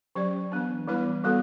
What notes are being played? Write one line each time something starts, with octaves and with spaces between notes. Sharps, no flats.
F#3 C#4 G4 D5
E3 B3 D4
E3 G3 B3 E4 B4
G3 B3 F#4 A4